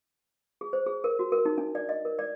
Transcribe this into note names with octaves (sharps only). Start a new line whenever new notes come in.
G#4
C5
G#4
A#4
F#4
A#4
D#4
D4
D5
D#5
A#4
D5